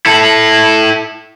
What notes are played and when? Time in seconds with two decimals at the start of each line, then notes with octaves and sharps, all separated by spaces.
0.06 E4 A4